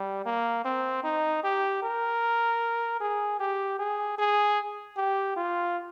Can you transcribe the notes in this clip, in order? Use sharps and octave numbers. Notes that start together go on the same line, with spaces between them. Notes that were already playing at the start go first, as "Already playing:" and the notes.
Already playing: G3
A#3
C4
D#4
G4
A#4
G#4
G4
G#4
G#4
G4
F4